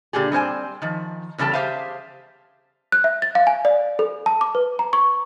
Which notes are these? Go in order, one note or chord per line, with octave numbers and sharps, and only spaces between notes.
A#2 D3 G4 G#4
G3 C4 C5 G#5
D#3 F3
E2 C#3 G3 A4 A5
G4 G#4 C5 E5 F5
F#6
E5
A6
F5
G#5
D5
A4
A5
D6
B4
A#5
C#6